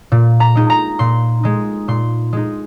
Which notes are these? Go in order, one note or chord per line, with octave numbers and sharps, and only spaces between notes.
A#2
A#5
G#3 D#4
A#5
A#2 C6
G#3 D#4
A#2 C6
G#3 D#4